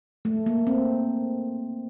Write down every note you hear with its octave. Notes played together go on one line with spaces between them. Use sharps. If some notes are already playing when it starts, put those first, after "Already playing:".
A3
A#3
C4